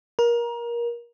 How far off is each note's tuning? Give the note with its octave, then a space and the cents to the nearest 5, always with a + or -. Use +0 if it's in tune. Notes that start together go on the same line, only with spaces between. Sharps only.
A#4 +25